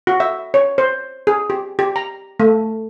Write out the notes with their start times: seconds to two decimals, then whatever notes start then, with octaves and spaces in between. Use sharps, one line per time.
0.07 F#4
0.20 E5
0.54 C#5
0.78 C5
1.27 G#4
1.50 G4
1.79 G4
1.96 A#5
2.40 A3